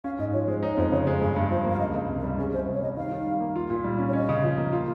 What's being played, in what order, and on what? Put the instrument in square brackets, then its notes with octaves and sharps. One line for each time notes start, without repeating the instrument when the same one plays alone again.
[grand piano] C#4 [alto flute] F5
[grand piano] G#2 [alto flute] D#5
[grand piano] F3 [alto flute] C#5
[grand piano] G#3 [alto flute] C5
[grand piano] D#4 [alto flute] C#5
[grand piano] F2 [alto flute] C5
[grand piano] C#3 [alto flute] C#5
[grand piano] G#3 [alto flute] C5
[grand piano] G2 [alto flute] G#4
[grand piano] G2
[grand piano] F3 [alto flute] C5
[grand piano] A#3
[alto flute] F5
[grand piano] C#2 [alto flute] D#5
[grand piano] C#2
C3
[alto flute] A#4
[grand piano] G3
[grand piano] C#4 [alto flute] G#4
[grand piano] C2 [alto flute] C5
[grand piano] C3
[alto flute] C#5
[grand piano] G3 [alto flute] D#5
[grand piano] D#3 [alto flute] F5
[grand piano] D#3
G3
A#3
F4
A#2
G3
C#4
[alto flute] C#5
[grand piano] C#4 [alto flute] D#5
[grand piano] C#3
F3
A#3
F4